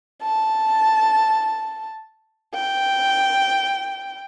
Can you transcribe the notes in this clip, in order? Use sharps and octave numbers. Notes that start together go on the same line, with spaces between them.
A5
G5